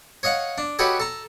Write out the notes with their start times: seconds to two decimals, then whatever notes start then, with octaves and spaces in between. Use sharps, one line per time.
0.23 C#5 D#5 F5 F#5
0.58 D4
0.79 F#4 G4 A4 B4 C#5 D#5
1.00 A4 A#5